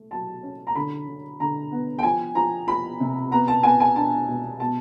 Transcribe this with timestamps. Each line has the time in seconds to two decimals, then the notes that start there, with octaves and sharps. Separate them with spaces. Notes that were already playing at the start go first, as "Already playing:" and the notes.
Already playing: A3
0.11 F#3 A5
0.43 C#4
0.67 A#5
0.75 D3 B5
1.08 D3
1.40 D3 A#5
1.72 B3
1.99 G5
2.03 F3 G#5
2.35 F3 A#5
2.67 F3 B5
3.00 C3
3.31 B3 A#5
3.48 A5
3.63 B3 G#5
3.80 G#5
3.96 D4 A5
4.28 B2
4.60 B2 A5